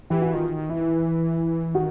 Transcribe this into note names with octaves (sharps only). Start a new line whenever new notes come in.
E3 G4
F#4
D#3 F4
E3 E4
D#3 F#4